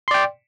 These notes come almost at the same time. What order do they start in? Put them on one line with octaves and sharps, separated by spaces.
C6 D5 G5